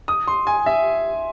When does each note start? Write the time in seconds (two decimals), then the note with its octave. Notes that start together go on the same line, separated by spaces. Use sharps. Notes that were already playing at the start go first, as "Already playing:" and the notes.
0.08 D#6
0.27 C6
0.47 G#5
0.66 E5